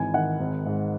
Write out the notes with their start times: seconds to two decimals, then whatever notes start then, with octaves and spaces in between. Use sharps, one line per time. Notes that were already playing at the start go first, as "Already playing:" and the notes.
Already playing: G#1 E3 G#5
0.14 D#3 F#5
0.40 G#1
0.66 G#2